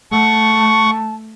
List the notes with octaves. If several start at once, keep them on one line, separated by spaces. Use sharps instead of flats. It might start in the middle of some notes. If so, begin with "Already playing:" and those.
A3 F#5 A5 C#6